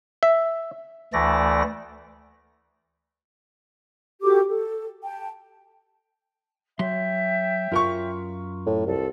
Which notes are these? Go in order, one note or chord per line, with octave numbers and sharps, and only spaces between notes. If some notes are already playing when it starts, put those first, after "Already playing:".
E5
D2 E3 A3 D5 A#6
F#4 G4 A4 D6
A4
G5 A5
F#3 C#5 E5 G5 C6
F#2 F4 A#4 C#6
A2
C2 A4 D5